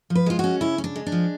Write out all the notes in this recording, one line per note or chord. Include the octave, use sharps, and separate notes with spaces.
F3
B4
G#3 F4
C#4 F#4
C#3 E4
C#4
D4
G#3
D4
F3